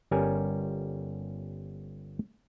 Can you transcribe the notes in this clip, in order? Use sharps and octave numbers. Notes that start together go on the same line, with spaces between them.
G1 G3 C#4 A#4 G#5